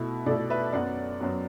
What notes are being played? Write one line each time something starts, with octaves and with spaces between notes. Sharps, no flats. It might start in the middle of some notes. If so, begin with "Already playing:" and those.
Already playing: B2 A3 E4 B5
B2 A3 E4 A4 D5
B4 E5
F#2 F#3 B3 D5 F#5
F#2 F#3 B3